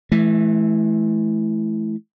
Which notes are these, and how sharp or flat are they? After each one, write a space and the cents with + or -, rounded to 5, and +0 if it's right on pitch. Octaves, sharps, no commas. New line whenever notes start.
E3 +0 A3 -35